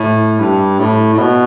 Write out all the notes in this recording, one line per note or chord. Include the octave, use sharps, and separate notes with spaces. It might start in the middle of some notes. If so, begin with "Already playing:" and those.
Already playing: A2
G2
A2
A2
B2